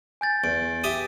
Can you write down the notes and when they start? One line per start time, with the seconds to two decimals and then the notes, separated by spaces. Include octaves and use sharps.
0.21 G#5 G6 A6
0.44 E2 D7
0.84 G4 E5 D#6